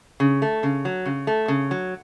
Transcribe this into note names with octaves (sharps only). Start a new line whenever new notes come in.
C#3
A3
C#3
F#3
C#3
A3
C#3
F#3